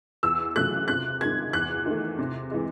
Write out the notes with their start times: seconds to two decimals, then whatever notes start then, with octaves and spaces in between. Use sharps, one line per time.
0.23 E2 E6
0.56 C#3 F#3 A3 F#6
0.88 C3 F#6
1.21 D#3 G#3 G#6
1.53 E2 F#6
1.86 D#3 A3
2.19 C3
2.51 E3 G#3